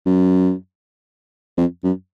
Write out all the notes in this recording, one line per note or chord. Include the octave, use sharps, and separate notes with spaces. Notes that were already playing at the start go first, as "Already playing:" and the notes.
F#2
F2
F#2